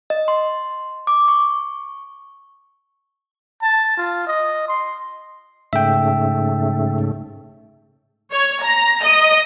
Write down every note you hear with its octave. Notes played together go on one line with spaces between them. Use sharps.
D#5
C6
D6
C#6
A5
F4
D#5
C6
G#2 C#3 A3 E5 G5
C#5
A#5
D#5